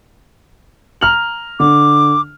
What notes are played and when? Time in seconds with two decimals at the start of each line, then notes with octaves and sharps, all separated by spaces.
1.01 A#5 F6 F#7
1.60 D3 D6